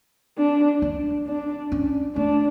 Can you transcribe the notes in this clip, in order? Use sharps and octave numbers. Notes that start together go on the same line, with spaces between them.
D4
D4
D4
C#4
A3 D4